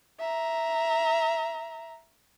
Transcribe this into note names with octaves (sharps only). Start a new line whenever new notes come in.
E5 A#5